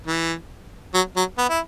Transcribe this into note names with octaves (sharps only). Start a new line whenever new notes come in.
E3
F#3
F#3
B3
E4